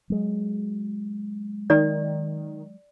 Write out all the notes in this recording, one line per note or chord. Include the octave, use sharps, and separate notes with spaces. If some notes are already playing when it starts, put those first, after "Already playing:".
F#3 G#3
D#3 D5